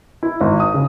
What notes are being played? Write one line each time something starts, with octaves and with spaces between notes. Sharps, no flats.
E4
G#1
D#6
C#3